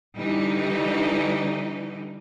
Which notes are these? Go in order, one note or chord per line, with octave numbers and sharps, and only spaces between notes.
D3 E3 G3 D#4